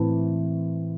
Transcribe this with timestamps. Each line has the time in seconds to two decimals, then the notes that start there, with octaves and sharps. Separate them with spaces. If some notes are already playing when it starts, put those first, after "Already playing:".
Already playing: A2 E3 A3 C4